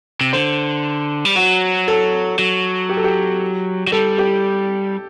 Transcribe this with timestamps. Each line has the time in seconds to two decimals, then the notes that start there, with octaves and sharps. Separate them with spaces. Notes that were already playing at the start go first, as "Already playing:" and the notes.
0.21 C3
0.33 D3 C5
1.25 G3
1.36 F#3 F#4
1.88 A4
2.39 F#3
2.89 G4
2.97 A4
3.04 G4
3.87 F#3
3.92 G3 A4
4.18 G4